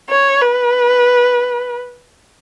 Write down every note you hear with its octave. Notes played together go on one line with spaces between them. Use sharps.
C#5
B4